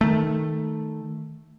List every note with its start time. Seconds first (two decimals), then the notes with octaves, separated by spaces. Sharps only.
0.01 D#3 A3